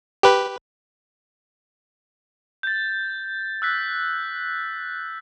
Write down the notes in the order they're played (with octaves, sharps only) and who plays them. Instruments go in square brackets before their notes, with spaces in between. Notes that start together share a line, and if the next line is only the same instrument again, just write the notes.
[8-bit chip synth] G4 B4
[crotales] G6 A6
E6 F#6 B6